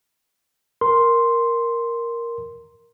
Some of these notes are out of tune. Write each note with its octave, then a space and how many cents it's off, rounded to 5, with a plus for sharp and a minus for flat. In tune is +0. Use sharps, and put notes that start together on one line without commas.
A#4 +5 C6 +0